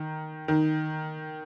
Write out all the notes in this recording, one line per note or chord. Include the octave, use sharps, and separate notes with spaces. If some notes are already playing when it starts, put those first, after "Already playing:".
Already playing: D#3
D#3